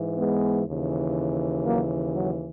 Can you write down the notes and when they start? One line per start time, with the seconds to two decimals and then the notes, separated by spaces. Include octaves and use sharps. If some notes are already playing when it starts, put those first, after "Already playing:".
Already playing: G#2 E3
0.18 G#3 B3
0.68 D#2 C#3 E3
1.66 F#3 A#3
2.15 F#3